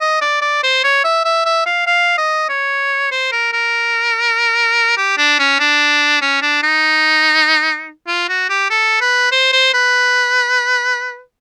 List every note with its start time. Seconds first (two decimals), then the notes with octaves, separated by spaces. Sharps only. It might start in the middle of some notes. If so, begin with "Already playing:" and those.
0.01 D#5
0.21 D5
0.42 D5
0.63 C5
0.84 C#5
1.04 E5
1.25 E5
1.45 E5
1.66 F5
1.87 F5
2.18 D#5
2.49 C#5
3.11 C5
3.32 A#4
3.53 A#4
4.97 G4
5.18 D4
5.39 C#4
5.60 D4
6.22 C#4
6.42 D4
6.63 D#4
8.08 F4
8.29 F#4
8.49 G4
8.70 A4
9.01 B4
9.32 C5
9.53 C5
9.74 B4